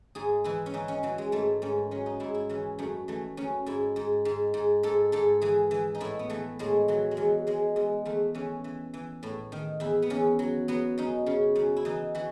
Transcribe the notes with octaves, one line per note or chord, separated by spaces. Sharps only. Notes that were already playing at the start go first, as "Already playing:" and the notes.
G#2 G#4
E3 E4
C#4
E3 D#4
C#4
E3 F#3
G#3
G#2 A3
G#2 C#4
F#3 C#4
D#4
G#2 E4
E4
E3 C#4
F#2 A3
E3 A3
F#2 C#4
G#2 E4
G#2
G#2
G#2
G#2 A4
G#2 A4
E3 G#4
E3
D#4
A2 E4
B3
E3 A3
A2 G#3
E3 F#3
G#3
E2 F#3
E2 G#3
E2 G#3
E2 A3
E3 C#4
E3
E3
A2
D#3
E2 E4
B3
E2 C#4
F#3
F#3 B3
F#2 D#4
C#3
F#2
E4
E3 D#4
E3 F#4